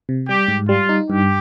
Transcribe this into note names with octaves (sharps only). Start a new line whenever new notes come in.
C3
G3 G4
G#2
G3 F4
D#4
G2 G4